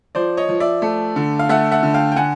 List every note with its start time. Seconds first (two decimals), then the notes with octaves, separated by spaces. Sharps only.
0.15 F3 C5 D5
0.37 C#5 D#5
0.49 F3
0.60 D5 E5
0.82 A3
1.16 D3
1.39 F5
1.49 A3 E5 F#5
1.71 E5 F#5
1.83 D3
1.94 F5 G5
2.12 G5
2.16 D3 F#5 G#5